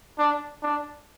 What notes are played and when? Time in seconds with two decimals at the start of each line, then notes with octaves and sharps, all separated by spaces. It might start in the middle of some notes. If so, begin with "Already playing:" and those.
0.19 D4
0.63 D4